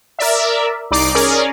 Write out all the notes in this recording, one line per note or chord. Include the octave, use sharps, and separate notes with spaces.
A#4 D5 E5
C2 D#4 D5 D6 C7 D7
C#4 G#4 A#4 D5